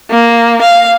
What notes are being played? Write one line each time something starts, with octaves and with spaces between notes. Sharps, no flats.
A#3
F5